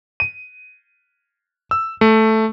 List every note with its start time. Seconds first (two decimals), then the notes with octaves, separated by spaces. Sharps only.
0.20 D#7
1.71 E6
2.01 A3